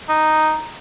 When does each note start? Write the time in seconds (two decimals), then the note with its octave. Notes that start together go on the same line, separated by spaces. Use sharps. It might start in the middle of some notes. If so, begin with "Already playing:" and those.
0.09 D#4